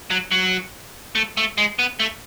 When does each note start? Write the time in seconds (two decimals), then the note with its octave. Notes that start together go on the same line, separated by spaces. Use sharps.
0.10 F#3
0.31 F#3
1.15 A3
1.37 A3
1.58 G#3
1.79 B3
2.00 A3